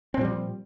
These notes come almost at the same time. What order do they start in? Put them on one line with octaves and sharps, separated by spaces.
C4 A#2 G3 F3